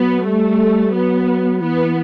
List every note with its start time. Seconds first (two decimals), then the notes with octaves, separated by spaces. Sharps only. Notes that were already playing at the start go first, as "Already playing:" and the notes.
Already playing: F#3 B3
0.24 G3 A3
0.92 F#3 B3
1.60 E3 B3